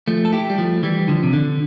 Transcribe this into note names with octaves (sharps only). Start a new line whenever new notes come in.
F3 A3
A4
E4 G4
G3
F3 A3
E3 G3
D3 F3
C3
D3